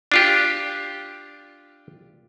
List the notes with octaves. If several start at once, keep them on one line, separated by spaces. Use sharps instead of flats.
D4 F4 G4